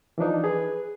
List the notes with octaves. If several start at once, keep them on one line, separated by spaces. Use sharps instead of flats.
E3 F3 D4 D#4
G#4 B4